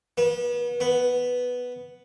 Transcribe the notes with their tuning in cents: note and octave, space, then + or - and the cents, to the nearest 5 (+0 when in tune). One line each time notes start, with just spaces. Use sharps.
B3 -35
B3 +0